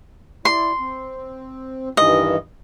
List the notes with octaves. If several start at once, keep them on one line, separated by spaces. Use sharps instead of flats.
E4 D5 C6
C4
G2 D#3 E3 D#5